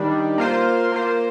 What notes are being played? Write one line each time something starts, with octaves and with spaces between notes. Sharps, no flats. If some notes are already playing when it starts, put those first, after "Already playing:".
Already playing: D#3 G3 D4
A#3 F4 C5
A#3 F4 C5